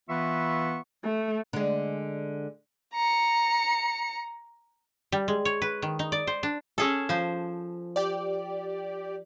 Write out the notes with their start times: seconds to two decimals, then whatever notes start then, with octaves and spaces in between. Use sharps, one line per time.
0.09 E3 B3 F4 E5 C#6
1.04 A3
1.53 D3 G#3
2.94 A#5 C#7
5.12 G3
5.28 G#3
5.45 C#5
5.62 B4
5.82 D#3
5.99 D#4
6.12 D5
6.27 C5
6.43 D4
6.78 C#4 G#4 A4
7.09 F3 C5
7.96 G4 D5